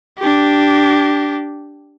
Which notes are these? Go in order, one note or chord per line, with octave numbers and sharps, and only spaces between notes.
D4 G4